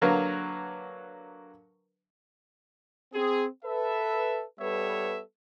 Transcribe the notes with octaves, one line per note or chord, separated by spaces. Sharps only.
D3 F#3 A#3 A#4 B4
C4 G#4
A4 B4 E5
G3 B3 A4 B4 C#5 E5